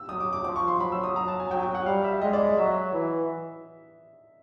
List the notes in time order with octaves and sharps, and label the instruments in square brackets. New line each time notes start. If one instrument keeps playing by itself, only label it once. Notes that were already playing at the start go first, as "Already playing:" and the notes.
Already playing: [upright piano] E6
[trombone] F#3 [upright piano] D#6
[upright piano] D6
D6
[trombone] F3 [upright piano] D6
[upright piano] C#6
C6
[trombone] F#3 [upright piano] B5
[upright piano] E6
D#6
[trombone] F#3 [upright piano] A#5
[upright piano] A5
G#5
[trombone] F#3 [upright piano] G5
[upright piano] G5
F#5
[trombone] G3 [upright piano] F5
[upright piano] E5
[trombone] G#3 [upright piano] D#5
[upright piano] D5
[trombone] F#3 [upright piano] E5
[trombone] E3